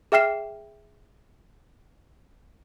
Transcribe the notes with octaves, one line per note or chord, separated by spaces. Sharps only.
G#4 E5 G5 F6 C7 E7